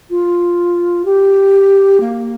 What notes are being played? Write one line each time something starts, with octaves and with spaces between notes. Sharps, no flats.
F4
G4
A#3